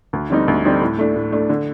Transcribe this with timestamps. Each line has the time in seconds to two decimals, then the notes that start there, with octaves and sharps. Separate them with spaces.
0.13 D2
0.30 D3 G3 C4 D#4
0.48 D2
0.64 D3 G3 C4 D#4
0.81 A2
0.99 A3 D4
1.15 A2
1.32 A3 D4
1.49 D3